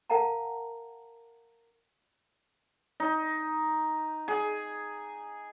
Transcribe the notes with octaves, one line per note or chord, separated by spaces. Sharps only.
A#4 F5 F#5 A5 A#5
D#4
G#4